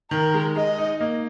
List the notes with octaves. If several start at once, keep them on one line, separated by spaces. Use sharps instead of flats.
D#3 A#4
G#3
G#3 D#5
D#4
A#3